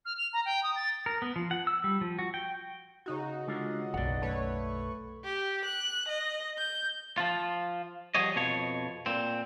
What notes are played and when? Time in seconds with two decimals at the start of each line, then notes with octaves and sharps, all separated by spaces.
0.05 F6
0.18 F7
0.33 A#5
0.45 G5
0.63 D#6
0.76 A6
1.06 A#4
1.22 B3
1.36 F3
1.51 F#5
1.67 E6
1.84 G3
2.01 F3
2.19 F#4
2.34 G5
3.06 C#3 D#4 F#4
3.47 D3 G#3 F4
3.94 F#1 B1 D5 F#5
4.22 A3 B4 C#5
5.24 G4
5.65 F#6
6.08 D#5
6.58 G6
7.18 F3 F4
8.15 F3 G3 F#4 G#4 C#5 D#5
8.36 F2 B2 F3 C#5
9.06 A#2 C4